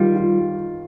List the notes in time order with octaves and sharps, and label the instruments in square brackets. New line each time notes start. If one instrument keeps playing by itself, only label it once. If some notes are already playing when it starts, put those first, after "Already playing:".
Already playing: [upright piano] D#3 F4 [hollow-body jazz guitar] G3
[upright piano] F4